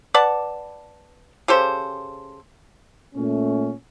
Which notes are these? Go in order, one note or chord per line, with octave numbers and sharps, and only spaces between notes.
B4 D5 F#5 A5
C#3 G4 A4 C5
A#2 A3 C#4